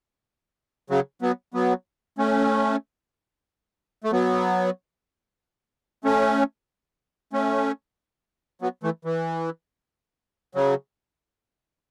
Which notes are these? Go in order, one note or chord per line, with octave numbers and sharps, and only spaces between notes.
C#3 F#3
F#3 B3
F#3 B3
A3 C#4
A3
F#3 B3
A3 C#4
A3 C#4
F#3 B3
E3 A3
E3
C#3 F#3